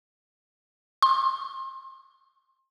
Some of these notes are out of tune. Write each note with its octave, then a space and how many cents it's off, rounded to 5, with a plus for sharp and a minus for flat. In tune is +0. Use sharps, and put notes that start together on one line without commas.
C6 +30